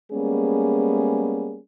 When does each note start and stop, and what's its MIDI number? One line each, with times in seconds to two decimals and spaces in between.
0.12 1.59 55
0.12 1.59 56
0.12 1.59 58
0.12 1.59 59
0.12 1.59 61
0.12 1.59 68